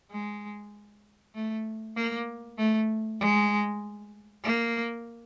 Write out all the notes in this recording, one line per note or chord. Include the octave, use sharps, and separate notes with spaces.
G#3
A3
A#3
A3
G#3
A#3